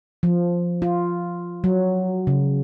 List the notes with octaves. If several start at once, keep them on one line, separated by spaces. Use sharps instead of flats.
F3
F4
F#3
C#3